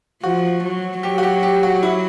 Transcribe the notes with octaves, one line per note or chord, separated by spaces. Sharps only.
F3 F#4
F#3
F#3 G4
F#4
G4
G4
F#4
E4